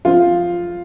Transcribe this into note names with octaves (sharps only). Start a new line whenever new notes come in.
F3 C4 F4